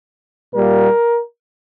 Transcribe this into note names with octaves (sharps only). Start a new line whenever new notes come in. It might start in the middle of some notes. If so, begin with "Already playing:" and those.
A#2 G3 A#3 A#4